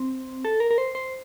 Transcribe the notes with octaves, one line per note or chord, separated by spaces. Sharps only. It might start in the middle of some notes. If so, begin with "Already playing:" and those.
Already playing: C4
A4
A#4
A#4
C5
C5